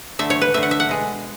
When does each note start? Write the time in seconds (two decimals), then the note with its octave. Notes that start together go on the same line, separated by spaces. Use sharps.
0.19 D3 A3 E5
0.30 C#5
0.41 B4
0.54 D3 A3 E5
0.63 F#5
0.71 E5
0.80 F#5
0.89 B2 G#3